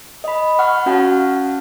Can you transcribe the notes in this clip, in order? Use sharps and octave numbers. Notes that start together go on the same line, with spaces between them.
D#5 B5
F#5 C#6 F6
C#4 F#4 F5 F#5 A5